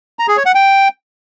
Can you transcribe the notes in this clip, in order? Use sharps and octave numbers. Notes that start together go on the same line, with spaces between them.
A#5
G#4
C#5
F#5
G5